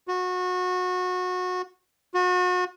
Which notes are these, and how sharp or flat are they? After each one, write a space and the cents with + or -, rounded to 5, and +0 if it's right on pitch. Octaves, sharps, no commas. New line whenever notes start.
F#4 -25
F#4 -35